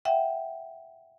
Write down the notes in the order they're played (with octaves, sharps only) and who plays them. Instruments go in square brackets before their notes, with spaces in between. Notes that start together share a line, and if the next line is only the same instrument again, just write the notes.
[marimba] E5 F#5 G5